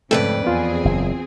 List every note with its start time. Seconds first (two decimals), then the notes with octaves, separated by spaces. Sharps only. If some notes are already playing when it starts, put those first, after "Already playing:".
0.11 F2 G#2 C#3 A3 A4 B4 D5 G5
0.44 E2 B3 C4 F4 G#4
0.85 F#1